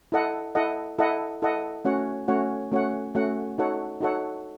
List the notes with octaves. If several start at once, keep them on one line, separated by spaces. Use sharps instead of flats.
E4 A4 D#5 F#5
E4 A4 D#5 F#5
E4 A4 D#5 F#5
E4 A4 D#5 F#5
A3 C#4 F#4 C#5 F#5
A3 C#4 F#4 C#5 F#5
A3 C#4 F#4 C#5 F#5
A3 C#4 F#4 C#5 F#5
D#4 F#4 A4 C#5 F#5
D#4 F#4 A4 C#5 F#5